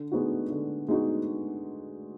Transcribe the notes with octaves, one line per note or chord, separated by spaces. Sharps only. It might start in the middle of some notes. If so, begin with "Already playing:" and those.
Already playing: D3
G#3 B3 D#4 F#4
D3
G#3 B3 D#4 F#4